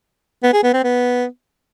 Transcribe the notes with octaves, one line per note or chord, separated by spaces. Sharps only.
B3
G#4
B3
C4
B3